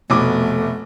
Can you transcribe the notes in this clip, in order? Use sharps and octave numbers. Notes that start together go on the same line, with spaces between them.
F1 B2 A3 D6